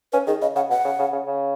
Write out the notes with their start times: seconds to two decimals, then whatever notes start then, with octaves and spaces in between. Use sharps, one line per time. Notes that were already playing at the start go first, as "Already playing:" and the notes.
0.13 C#4 B4
0.27 D#3 G#4
0.42 C#3 D#5
0.55 C#3 F#5
0.70 B2 F#5
0.85 C#3
0.99 C#3
1.13 C#3
1.27 C#3